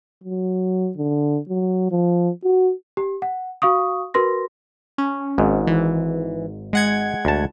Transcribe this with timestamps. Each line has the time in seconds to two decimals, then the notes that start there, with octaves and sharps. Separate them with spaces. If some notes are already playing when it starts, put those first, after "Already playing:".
0.24 F#3
0.97 D3
1.49 F#3
1.91 F3
2.44 F#4
2.97 G4
3.22 F#5
3.62 F#4 F5 C#6 D#6
4.14 F#4 A#4 B4 C6 A#6
4.98 C#4
5.38 G#1 G#2
5.67 E3
6.73 G#3 F#5 G#6
7.25 D2 A5